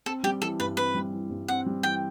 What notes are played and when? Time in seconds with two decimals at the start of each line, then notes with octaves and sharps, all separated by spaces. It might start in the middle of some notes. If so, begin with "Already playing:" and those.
0.06 C4 A4
0.24 G3 G4
0.41 E3 A4
0.60 G2 B4
0.77 C4 B4
0.95 G3
1.13 E3
1.30 G2
1.48 C4 F#5
1.66 G3
1.83 E3 G5